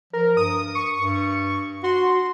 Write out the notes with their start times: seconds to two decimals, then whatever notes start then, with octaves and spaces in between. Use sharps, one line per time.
0.13 F3 A#4
0.37 G2 D#6
0.75 C#6
0.99 G2
1.84 F#4 C6